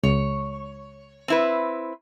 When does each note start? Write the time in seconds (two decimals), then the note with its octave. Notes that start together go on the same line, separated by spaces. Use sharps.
0.04 C#2 C#5
1.28 C4 E4 B4